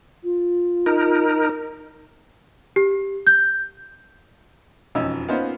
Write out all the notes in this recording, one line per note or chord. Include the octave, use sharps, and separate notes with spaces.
F4
D#4 A#4
G4
G6
E1 F2 C#4 D#4 E6
A#3 B3 C#4 D#4 F4 C5